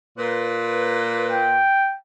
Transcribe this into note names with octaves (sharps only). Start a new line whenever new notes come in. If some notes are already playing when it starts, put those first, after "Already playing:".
A#2 B4
G5